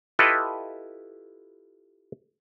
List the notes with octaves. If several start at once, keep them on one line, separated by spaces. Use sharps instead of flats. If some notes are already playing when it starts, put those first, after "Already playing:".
E4 F4 G4 A4 B4 D#5